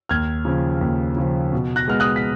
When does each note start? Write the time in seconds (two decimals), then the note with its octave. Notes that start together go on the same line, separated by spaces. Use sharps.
0.09 D#2 F6 G#6
0.45 C#3 F3
0.81 D#2
1.17 C#3 F3
1.53 B2
1.76 F#6 A#6
1.88 G#3 B3 F6
2.00 D#6 F#6
2.16 B6